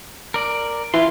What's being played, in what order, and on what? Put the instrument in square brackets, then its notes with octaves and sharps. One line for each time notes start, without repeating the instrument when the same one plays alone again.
[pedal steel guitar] A#4 D5
[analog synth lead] E3 [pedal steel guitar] F4 C6